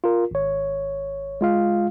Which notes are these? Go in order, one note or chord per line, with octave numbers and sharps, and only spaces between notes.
F4 A#4
G#1 C#5
G#3 F4 F5